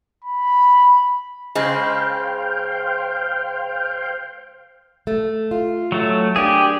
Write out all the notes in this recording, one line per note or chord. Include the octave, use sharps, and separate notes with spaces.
B5
C#3 G#3 C5 F5 G5
A3
F4
F#3 A3
A#3 D4 G4 G#4